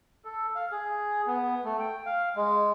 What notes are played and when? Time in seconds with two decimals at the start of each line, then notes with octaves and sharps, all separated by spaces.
0.25 A4
0.55 F5
0.72 G#4
1.27 B3
1.64 A3
1.79 G5
2.06 F5
2.36 G#3